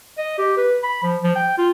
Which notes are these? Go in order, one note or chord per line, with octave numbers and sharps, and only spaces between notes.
D#5
G4
B4
B5
F3
F3
G5
F4